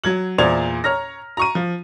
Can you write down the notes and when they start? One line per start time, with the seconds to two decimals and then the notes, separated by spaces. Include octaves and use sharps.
0.04 F#3 G#6 F#7
0.38 E2 A#2 C5 D5 G#6 F7
0.84 C#5 A#5 F6 A#6
1.37 A#5 C#6 D#7
1.55 F3